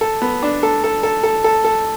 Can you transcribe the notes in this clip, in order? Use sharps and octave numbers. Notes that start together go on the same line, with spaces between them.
A4
B3
D4
A4
A4
A4
A4
A4
A4